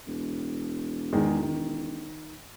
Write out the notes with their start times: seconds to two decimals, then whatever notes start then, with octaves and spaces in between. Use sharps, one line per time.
0.07 E1
1.13 E2 D#3 G#3
1.43 D#3